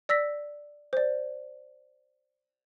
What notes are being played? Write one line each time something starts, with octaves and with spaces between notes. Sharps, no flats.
D5 E6 A#6 B6
C5 D5